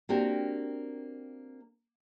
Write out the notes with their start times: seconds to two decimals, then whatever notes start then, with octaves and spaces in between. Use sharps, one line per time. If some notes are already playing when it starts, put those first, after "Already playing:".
0.09 A#3 C4 D4 F#4 G4 A#4